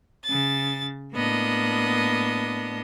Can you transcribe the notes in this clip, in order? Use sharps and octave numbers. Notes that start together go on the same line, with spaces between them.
C#3 A6
A2 A#3 B3 D4 D#5